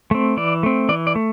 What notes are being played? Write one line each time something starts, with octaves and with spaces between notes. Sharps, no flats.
A3 C4
E3 D5
A3 C4
E3 D5
D5
A3